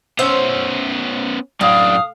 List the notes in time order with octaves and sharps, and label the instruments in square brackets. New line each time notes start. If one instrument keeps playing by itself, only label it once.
[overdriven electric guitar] B3 C#4 [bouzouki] C5 E5
[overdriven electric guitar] F#2 D4 [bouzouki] A2 [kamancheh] F5 [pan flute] D#6